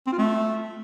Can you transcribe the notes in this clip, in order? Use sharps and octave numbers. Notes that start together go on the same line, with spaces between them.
C4
F4
A3